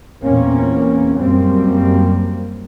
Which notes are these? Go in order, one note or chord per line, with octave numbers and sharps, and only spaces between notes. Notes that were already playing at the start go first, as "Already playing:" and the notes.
E2 A#2 A#3 C4 C#4
F#2 G3 A#3 C4